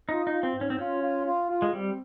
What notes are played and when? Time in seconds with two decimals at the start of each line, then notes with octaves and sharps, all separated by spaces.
0.09 D#4 F4
0.27 D#4
0.32 F4
0.43 C4
0.55 G#2
0.61 C#4
0.70 C4
0.79 C#4 F4
1.02 F4
1.25 F4
1.50 F4
1.62 G#3
1.73 G3 C4